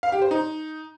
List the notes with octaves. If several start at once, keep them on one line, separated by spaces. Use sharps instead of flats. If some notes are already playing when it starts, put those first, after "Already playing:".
F5
G4
C5
D#4